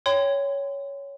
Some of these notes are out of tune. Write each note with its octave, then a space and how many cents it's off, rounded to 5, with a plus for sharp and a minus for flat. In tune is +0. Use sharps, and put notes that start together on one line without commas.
C#5 +10 G5 +15 C6 -35